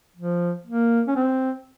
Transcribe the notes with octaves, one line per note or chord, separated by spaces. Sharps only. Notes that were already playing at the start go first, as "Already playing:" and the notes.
F3
A#3
C#4
C4